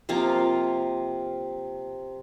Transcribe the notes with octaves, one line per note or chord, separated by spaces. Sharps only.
C3 F3 A#3 F4